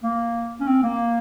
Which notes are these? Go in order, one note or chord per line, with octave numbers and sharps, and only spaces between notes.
A#3
C#4
C4
A#3